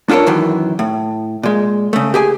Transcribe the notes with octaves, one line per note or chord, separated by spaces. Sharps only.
D4 F4 A4 A#4 C#5
F#2 D#3 E3
A2
A#2 G#3
C#3 A3
G4 G#4 G#5